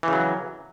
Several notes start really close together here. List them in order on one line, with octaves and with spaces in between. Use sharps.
E3 C#3 F#3